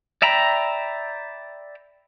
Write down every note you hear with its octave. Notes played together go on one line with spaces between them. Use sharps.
D5 E5 G5 A#5 B5